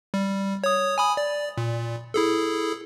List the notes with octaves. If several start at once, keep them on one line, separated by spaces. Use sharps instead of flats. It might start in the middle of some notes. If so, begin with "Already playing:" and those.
G3
C#5 D#6
G#5 B5 D#6
D5
A#2
E4 G#4 A4